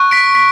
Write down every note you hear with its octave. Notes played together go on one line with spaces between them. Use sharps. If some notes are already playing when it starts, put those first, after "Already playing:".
Already playing: C#6 F#6
B6 D7
B6